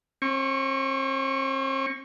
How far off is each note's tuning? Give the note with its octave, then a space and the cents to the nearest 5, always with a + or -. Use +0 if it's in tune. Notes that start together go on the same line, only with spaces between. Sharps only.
C4 +45 C#6 +0